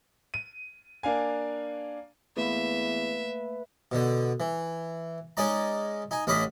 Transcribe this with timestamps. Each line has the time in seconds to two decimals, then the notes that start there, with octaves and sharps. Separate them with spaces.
0.34 D#7
1.03 A#3 D4 F5 G#5
2.37 E2 A3 A#3 B4 E5 F5
3.91 B2 D3
4.40 E3
5.37 G#3 C#4 D#4 D5 A#5
6.11 D#4 G#5
6.27 A1 C#4 D4 D#5 B5